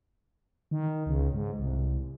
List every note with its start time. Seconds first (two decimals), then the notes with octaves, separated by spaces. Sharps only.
0.71 D#3
1.06 C#2
1.34 G#2
1.60 C2